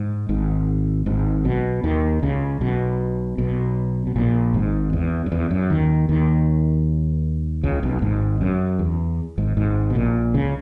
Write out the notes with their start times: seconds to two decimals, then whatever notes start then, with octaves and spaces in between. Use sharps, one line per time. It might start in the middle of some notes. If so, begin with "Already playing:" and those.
Already playing: G#2
0.29 G#1 G#2
1.06 G#1 G#2
1.45 B1 B2
1.84 D#2 D#3
2.23 C#2 C#3
2.61 B1 B2
3.38 B1 B2
4.07 B2
4.16 A#1 A#2
4.54 G#1 G#2
4.93 E2
5.26 F#2
5.32 E2
5.51 F#2
5.70 D#2 D#3
6.09 D#2 D#3
7.63 C#2 C#3
7.83 B1 B2
8.02 G#1 G#2
8.41 F#2
8.79 E2
9.38 G#1 G#2
9.57 G#1 G#2
9.90 B2
9.95 A#1 A#2
10.34 C#2 C#3